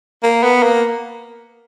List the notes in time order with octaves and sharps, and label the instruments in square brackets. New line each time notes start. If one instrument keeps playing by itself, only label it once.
[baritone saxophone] A#3
B3
A#3